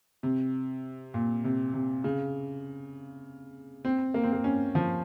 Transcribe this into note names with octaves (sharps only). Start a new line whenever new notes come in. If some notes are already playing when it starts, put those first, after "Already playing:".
C3
A#2
C3
C3
C#3
C4
A#3
C4
A#3
C#4
F3